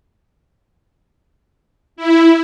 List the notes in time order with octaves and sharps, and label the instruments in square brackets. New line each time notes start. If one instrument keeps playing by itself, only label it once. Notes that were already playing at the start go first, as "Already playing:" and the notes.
[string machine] E4